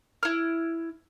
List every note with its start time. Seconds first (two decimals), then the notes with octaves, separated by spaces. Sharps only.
0.23 E4 F6